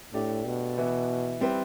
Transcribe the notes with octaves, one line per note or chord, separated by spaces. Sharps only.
A2 A3 D4 G4 D5
B2
E3 B3 E4
G3 C4 E4 B4